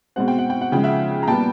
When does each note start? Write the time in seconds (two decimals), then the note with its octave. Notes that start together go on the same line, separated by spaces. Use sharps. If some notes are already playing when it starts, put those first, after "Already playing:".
0.16 B2 G#3 C4 F#5
0.28 G5
0.38 F#5
0.50 G5
0.61 F#5
0.72 C#3 F3 G#3 G5
0.84 E5 F#5
1.23 A#5
1.27 A#2 G3 B3 G5 A5